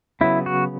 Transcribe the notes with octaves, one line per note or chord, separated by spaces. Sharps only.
C#3 F#3 B3 E4
F#4